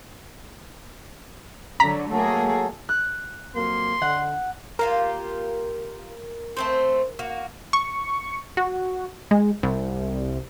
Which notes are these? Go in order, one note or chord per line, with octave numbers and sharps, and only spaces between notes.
D3 F#3 A#5 B6
F#3 A3 A#3 G#4 A4
F#6
F2 F#3 A#3 C6
D3 F#5
A#3 F4 G4 A#4
A3 C4 C5
A#3 F#4
C#6
F#4
G#3
C2